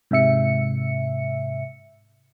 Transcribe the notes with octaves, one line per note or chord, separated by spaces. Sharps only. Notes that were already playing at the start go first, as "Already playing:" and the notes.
G#2 C3 E5 C#7